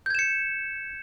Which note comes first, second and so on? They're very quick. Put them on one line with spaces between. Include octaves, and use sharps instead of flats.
G6 G#6 E7 C#7